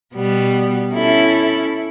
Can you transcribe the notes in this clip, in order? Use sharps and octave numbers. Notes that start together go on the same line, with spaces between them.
B2 G3 B3
C#4 E4 A4